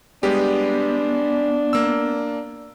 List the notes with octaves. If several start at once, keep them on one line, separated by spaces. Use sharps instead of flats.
G3 G#3 B3 D4 G4
A#3 E6